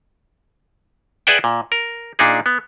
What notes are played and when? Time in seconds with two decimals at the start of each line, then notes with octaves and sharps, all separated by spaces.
1.27 G#4 B4 D5 E5 F#5 G5
1.44 A#2
1.72 A#4
2.19 A#2 D4 D#4 G#4
2.46 B3